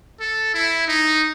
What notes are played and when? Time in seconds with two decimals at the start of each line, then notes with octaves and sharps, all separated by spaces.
0.21 A4
0.54 E4
0.87 D#4